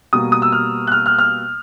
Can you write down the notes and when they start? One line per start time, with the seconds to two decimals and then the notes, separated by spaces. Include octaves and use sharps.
0.13 B2 G3 A#3 D#6
0.32 D#6
0.42 E6
0.52 F6
0.87 F#6
0.92 F6
1.06 F6
1.19 F6